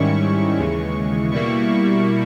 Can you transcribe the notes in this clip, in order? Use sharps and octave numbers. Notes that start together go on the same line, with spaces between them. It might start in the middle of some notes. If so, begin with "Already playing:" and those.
Already playing: G#2 D#3 G3 C#4 E4 C#6
C#6
D#2 C#3 E3 G#3
B2 G3 A#3 E4 C#6
C#6